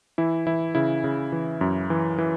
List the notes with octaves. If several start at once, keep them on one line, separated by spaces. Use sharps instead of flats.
E3 E4
E3 E4
C#3 E4
C#3
E3
F#2
E3
E3